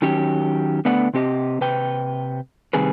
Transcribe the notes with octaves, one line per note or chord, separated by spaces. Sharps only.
D#3 F#3 C#4 G4
D3 A3 B3 B4 D5 F#5
C3 C4 G4 D#5
C3 B4 G5
C3 D#3 G3 C4 G#4 B4